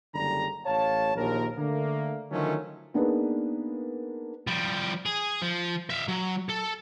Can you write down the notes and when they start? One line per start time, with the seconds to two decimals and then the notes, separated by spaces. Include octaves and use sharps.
0.15 F#1 D3 G3 D4 A#5
0.65 A1 C#5 F5 A5
1.16 A#1 D#2 A#4
1.57 D3 A3 A#3
2.31 D3 D#3 F3 F#3 A3 C#4
2.94 A#3 B3 D4 D#4 G#4 B4
4.47 F3 G3
5.06 G#4
5.42 F3
5.90 E5 F5
6.08 F#3
6.49 A4